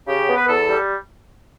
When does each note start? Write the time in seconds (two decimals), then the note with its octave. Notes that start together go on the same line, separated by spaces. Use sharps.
0.07 C#3 G4
0.28 B3
0.36 B4
0.48 E2 A4
0.68 G3